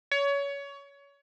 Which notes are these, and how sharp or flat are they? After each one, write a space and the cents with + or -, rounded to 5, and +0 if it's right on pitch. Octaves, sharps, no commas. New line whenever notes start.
C#5 +25